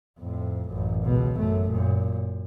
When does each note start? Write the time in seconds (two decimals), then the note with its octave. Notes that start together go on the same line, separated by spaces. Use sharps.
0.18 F2 A2
0.68 A1 F#2
1.02 C#2 B2
1.35 F#2 A3
1.67 F#2 A#2